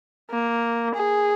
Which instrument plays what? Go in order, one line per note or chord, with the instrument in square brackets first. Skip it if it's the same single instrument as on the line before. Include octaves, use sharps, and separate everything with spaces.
[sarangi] A#3
G#4